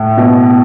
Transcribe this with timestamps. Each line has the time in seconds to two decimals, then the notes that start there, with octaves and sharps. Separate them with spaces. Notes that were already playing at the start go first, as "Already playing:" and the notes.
Already playing: A2
0.18 B2